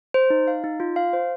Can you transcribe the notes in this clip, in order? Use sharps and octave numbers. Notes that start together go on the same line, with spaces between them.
C5
D#4
F5
D#4
F4
F5
C5